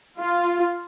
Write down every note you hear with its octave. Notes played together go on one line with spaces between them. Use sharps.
F4